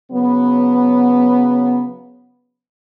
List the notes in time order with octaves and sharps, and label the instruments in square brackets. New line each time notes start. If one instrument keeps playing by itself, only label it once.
[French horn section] C#3 F#3 B3